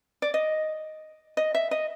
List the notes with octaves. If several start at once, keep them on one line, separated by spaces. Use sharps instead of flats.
D5
D#5
D#5
E5
D#5